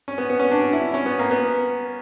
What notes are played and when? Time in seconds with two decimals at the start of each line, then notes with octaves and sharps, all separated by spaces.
0.08 C#4
0.18 B3
0.30 B3
0.39 C#4
0.51 D4
0.61 D4
0.73 E4
0.94 C#4
1.06 B3
1.19 A#3
1.31 B3